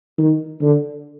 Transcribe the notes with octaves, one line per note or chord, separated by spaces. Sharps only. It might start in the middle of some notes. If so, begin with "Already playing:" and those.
D#3
D3